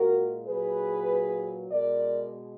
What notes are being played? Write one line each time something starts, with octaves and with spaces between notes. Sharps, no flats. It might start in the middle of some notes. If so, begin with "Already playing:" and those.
Already playing: A#2 G#3 F#4 A#4
A#2 F#3 G#4 B4
B2 G#3 A#4 D5